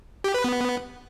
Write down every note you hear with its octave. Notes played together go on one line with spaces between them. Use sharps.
G4
B4
B3